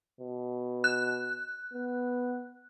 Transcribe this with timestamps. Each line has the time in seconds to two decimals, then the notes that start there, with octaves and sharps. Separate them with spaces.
0.21 B2
0.84 F#6
1.73 B3